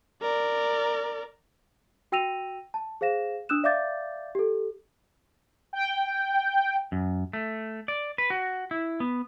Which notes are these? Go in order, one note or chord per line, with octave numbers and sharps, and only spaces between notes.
A#4 D5
F#4 G5 E6 A#6 D#7 F7
A5
G#4 C5 F5 A#6 E7
D4 D#6 E6 F#6 E7
D5 E5 F5 D6 G6 A6
G4 A4
G5
F#2
A3
D5
B4
F#4
E4
B3